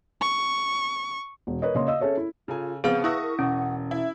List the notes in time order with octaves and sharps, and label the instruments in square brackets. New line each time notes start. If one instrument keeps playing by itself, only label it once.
[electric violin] C#6
[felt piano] E1
A#4 B4 C#5 D#5
C#3 A#3 C#5 D#5 F5 C6
D#5 F5 E6
C#4 G#4 A4 C#5 E5
E4
[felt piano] C#3 A4 G#5 [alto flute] F4
[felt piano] C#3 [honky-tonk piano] F3 B3 [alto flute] C4 [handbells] G#4 F5 F6
[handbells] E4 [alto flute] B4 [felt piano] E5 F#5 E6 [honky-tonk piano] C#6 D#6 A#6
[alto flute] A#4
[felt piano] E1 E3 [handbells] C#4 [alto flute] F#5
[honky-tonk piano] E4 [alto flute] E5